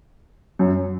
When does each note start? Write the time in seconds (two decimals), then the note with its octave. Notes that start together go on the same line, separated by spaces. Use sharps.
0.59 F#2